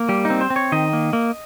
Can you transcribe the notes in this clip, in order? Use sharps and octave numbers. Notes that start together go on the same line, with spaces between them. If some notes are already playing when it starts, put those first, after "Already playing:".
Already playing: A#3
G3 G4
D#4
C4
C5
C4
C#5
D#3 D#5
A#3
A#3